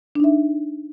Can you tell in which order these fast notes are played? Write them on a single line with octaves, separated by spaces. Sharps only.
D4 D#4 E5